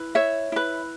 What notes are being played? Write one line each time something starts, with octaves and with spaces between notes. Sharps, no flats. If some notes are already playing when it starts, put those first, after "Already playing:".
Already playing: E4 B4
C#5 E5
E4 B4